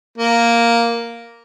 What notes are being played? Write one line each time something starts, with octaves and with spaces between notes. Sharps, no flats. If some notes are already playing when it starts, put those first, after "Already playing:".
A#3